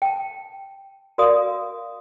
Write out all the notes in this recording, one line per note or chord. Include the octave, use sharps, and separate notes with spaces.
G5 A5
F#4 A#4 D5 F5 D#6